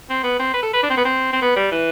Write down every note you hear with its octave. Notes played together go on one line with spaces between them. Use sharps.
C4
B3
C4
B4
A4
B4
D4
C4
B3
C4
C4
B3
G3
E3